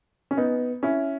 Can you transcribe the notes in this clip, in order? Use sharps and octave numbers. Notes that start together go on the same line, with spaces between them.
C#4
B3 D#4
C#4 E4